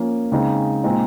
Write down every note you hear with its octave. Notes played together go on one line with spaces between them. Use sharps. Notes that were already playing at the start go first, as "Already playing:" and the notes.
Already playing: F3 A#3 C#4
C#3 G#3 C4 D#4
A#2 G#3 C4 D#4